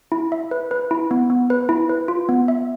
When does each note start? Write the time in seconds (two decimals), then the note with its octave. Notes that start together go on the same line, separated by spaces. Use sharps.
0.12 E4
0.32 E5
0.51 B4
0.71 B4
0.91 E4
1.11 B3
1.30 B3
1.50 B4
1.69 E4
1.89 B4
2.08 F4
2.29 B3
2.48 E5